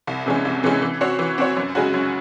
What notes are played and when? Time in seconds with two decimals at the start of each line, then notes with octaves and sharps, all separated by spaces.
0.07 C2
0.26 C3 E3 G#3 C#4
0.45 C2
0.63 C3 E3 G#3 C#4
0.82 E3
1.01 C4 F#4 C#5
1.19 E3
1.38 C4 F#4 C#5
1.57 F#2
1.75 C#3 G#3 C#4 F#4
1.94 F#2